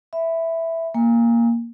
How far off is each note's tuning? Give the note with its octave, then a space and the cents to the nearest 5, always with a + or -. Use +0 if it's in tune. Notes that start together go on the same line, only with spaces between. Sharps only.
E5 +0 B5 +15
A#3 +0 G#5 -30